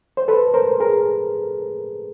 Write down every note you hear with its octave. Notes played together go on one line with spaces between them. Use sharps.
C5
A4 B4
A#4 C5
G#4 A#4